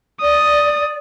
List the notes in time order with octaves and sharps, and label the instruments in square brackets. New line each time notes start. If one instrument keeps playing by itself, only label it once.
[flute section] D5 [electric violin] D#6